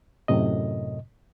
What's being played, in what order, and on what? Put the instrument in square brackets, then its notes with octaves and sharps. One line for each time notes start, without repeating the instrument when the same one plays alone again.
[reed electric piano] F#2 A2 C3 D#5